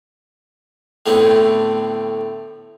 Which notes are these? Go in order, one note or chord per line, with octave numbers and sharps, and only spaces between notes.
A2 D3 A3 B3 C4